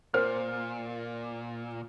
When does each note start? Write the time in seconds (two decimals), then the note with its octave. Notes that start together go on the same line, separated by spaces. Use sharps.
0.14 A#2 A#4 C5 F6